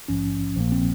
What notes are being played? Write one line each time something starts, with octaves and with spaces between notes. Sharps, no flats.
A#1 G#2 F3 C#4
A#1 A#2 F3 A#3
C4